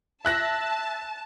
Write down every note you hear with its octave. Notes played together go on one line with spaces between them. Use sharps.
E5 A5 F#6 A#6